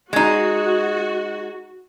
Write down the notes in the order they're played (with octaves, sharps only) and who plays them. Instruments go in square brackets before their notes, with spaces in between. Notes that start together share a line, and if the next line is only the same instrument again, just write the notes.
[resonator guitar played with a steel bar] G#3 D#4 [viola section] F#4